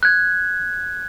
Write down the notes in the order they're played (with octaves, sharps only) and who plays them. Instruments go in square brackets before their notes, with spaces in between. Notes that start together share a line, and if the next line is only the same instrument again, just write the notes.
[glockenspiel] F#6 G#6